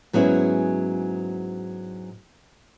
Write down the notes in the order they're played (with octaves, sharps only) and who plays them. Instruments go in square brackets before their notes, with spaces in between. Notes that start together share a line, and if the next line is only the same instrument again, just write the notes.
[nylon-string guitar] G#2 F#3 B3 C#4 E4 G#4